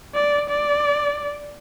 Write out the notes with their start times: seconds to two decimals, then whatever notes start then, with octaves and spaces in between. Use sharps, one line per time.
0.15 D5
0.50 D5